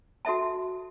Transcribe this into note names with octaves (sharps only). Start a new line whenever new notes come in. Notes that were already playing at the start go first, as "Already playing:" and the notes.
F#4 A4 E5 A5